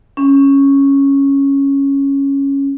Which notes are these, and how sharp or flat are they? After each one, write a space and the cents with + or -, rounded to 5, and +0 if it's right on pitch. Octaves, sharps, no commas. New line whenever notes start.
C#4 -5